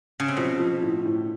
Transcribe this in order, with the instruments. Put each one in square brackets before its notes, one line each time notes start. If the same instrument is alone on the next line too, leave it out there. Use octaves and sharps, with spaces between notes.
[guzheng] C#3
C3
[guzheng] B2 [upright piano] F3
[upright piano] F3
A2
A2